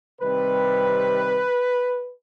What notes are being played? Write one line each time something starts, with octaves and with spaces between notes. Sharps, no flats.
C3 D#3 G3 C4 B4